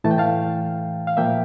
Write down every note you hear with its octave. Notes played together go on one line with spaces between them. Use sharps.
A2 E3 A3 A5
G5
F5 A5
F5
A#2 F3 A#3 E5 G5